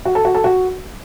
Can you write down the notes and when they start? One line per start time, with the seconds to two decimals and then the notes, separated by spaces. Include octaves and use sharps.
0.05 F#4
0.15 A4
0.25 F#4
0.35 A4
0.44 F#4